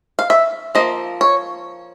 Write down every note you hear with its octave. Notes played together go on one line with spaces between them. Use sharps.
F5
E5
F3 A#3 D#5
C#5